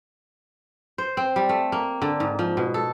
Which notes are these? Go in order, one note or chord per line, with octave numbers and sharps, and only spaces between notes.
C5
C4
G3
A3
A#3
D3
G#2
F3
B2
A4